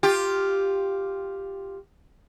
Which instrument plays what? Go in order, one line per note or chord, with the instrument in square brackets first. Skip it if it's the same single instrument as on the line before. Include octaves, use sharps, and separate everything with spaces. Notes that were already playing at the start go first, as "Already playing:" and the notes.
[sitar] F4 G4